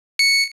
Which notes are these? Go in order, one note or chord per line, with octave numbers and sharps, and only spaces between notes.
C#7